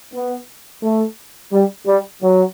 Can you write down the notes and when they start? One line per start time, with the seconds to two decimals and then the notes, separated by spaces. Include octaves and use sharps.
0.13 B3
0.83 A3
1.53 G3
1.86 G3
2.22 F#3